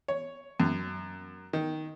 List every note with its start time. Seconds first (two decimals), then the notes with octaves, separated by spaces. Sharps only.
0.08 C#5
0.60 F#2
1.53 D#3